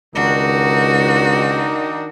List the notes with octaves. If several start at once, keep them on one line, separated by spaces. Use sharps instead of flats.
C#2 D#3 D4 D#4 F#4